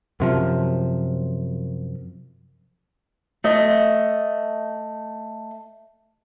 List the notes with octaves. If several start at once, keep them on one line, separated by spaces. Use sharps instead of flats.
F#2 C3 F3
A3 D#5